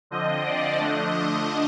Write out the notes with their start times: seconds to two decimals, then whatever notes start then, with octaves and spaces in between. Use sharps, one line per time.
0.11 D3 F3 C4 D#5
0.45 D5
0.78 D3 F3 A3 D4 D#5
1.11 D#5